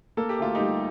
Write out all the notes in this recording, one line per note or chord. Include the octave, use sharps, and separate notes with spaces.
A#3 A4
G4
D2 F4
D#4 G4
G3